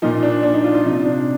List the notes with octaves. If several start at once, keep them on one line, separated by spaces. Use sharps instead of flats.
A#2 F3 D#4
D4
D4
D#4
F4
F4
C3 F3 D#4
D4